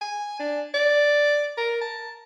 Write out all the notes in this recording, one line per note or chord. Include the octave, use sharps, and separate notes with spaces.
G#5
D4
D5
A#4
A5